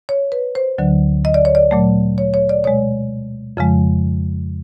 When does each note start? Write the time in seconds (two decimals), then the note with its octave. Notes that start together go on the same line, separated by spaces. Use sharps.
0.09 C#5
0.32 B4
0.55 C5
0.78 D2 D3 F#3
1.25 D#5
1.34 D5
1.45 C#5
1.55 D5
1.71 A#2 F#3 A3
2.18 C#5
2.34 C#5
2.49 D5
2.64 B2 G#3 C#5
3.57 F2 C#3 F3 G#3